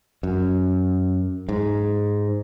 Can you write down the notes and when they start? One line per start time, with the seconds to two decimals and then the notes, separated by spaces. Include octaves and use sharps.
0.23 F#2
1.49 G#2